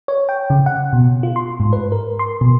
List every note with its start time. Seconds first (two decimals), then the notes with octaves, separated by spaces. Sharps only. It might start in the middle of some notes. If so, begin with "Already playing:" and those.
0.08 C#5
0.29 G5
0.50 C#3
0.66 F#5
0.93 B2
1.23 F4
1.36 C6
1.60 G#2
1.73 B4
1.92 A#4
2.19 C6
2.41 B2